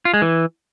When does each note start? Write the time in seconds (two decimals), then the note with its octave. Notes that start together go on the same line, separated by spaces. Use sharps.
0.05 F4
0.14 G#3
0.22 E3